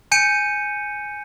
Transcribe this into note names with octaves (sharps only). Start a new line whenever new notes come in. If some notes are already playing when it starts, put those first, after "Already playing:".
G#5 G6 C#7 D#7